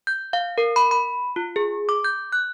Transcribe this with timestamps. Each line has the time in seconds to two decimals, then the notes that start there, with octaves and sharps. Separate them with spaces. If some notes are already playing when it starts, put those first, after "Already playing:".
0.07 G6
0.33 F5
0.58 A#4
0.76 B5
0.91 B5
1.36 F4
1.56 G#4
1.89 D6
2.04 G6
2.33 F#6